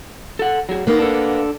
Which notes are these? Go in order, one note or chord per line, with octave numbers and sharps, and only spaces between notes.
A4 F#5
F#3 G#4
A#3 B3 D#4 B4
D4 A4